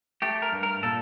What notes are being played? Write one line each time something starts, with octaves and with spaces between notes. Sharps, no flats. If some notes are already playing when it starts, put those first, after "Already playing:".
A3 G4
A#4
G2
A#4
A#2 A4